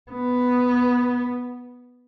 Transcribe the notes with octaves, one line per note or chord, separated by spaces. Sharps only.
B3